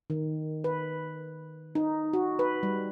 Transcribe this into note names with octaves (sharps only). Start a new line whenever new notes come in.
D#3
B4
D#4
F#4
B4
G3